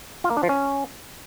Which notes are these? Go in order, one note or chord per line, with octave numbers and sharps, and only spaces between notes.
F4
A#3
D4
F3
C#4